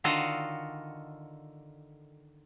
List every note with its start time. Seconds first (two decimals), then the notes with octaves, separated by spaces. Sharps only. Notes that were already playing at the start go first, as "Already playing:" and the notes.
0.04 D3 D#3 F4 F#4 A4 D#5